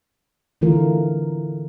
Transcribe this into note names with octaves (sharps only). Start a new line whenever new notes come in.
D3 E3 A3 F4 A#4